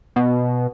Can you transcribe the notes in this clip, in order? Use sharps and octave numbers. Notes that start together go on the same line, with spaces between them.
B2